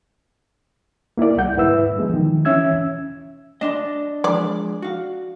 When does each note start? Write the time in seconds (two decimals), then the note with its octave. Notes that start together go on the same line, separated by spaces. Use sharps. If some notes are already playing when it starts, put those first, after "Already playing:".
1.17 A#3 E4 A#4 D5
1.37 C2 G3 F#5 G6
1.57 G#2 E4 B4 E5 E6
1.97 E3 F3 G#3 B3
2.14 D#3 F3
2.45 E3 C#4 E5 E6 G#6
3.61 D4 D#5 A5 C6
4.24 F3 G#3 D5
4.82 F#4 F5